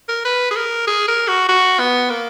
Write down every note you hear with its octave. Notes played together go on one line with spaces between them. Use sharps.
A#4
B4
G#4
A#4
G#4
A#4
F#4
F#4
B3
A#3